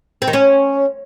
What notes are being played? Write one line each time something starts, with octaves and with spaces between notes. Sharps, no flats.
C4
D#3
C#4